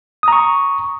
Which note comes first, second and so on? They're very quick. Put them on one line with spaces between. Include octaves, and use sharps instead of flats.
D#6 A#5 C#6